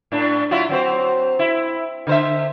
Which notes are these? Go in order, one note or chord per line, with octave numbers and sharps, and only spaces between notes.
A2 D4
F#3 E4 F4
F#3 C4 C5
E4
D3 C5 E5